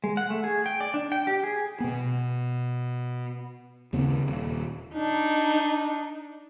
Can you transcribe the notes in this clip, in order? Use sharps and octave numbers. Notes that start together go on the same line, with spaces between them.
G#3
F#5
A3
G#4
G5
D5
D4
G5
G4
G#4
B2 B3
D#2 C#3 C4
D#1
D4 D#4